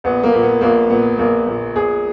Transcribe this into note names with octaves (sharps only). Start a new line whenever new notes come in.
A#1 B3
A#3
A#2
B3
A#1 A#3
A#2 B3
A#1 A#3
A#2
A#1 G#4